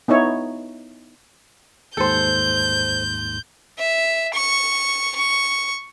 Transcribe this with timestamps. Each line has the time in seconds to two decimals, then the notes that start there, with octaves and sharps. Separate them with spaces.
0.08 B3 D#4 E4 C#5
1.97 D#2 G#2 A4 C5 C6 G6
3.78 E5
4.33 C#6
5.15 C#6